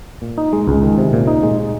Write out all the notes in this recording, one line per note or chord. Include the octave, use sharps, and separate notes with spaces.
A#2
D#4
G#3
C#2
D#3
C3
A#2
D#4
G#3